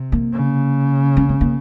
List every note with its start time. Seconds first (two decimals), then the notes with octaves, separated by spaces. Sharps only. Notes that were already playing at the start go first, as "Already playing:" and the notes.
Already playing: C3
0.12 A#3
0.32 C#3
1.17 C#4
1.29 C4
1.41 A#3